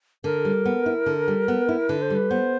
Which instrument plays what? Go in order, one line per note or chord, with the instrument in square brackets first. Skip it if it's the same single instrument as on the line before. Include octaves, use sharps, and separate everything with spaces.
[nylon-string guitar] D3 [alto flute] A#4
[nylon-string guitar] G3
B3
E4
D3
G3
B3
E4
[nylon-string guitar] D3 [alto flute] B4
[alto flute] C5
[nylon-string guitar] G3 [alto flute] B4
[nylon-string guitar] B3 [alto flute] C5